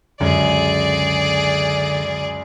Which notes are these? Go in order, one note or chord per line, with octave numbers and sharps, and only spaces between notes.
C#2 F#2 D3 G#4 D5